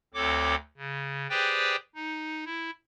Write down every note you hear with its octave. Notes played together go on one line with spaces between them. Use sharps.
D2 C4 A4 C#5 D6
C#3
G4 G#4 B4 C5 D5 G5
D#4
E4